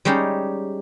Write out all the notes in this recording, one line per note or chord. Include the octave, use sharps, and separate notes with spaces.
G3 G#3 C#4 D#4 G4